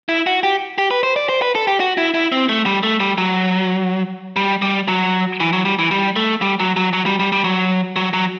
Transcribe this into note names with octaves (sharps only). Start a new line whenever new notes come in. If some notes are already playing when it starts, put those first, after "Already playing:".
E4
F#4
G4
G4
B4
C5
D5
C5
B4
A4
G4
F#4
E4
E4
C4
A3
G3
A3
G3
F#3
G3
G3
F#3
E3
F#3
G3
E3
G3
A3
G3
F#3
F#3
F#3
G3
G3
G3
F#3
F#3
F#3